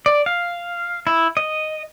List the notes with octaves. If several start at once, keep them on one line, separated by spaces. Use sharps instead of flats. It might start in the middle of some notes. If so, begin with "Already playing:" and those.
D5
F5
E4
D#5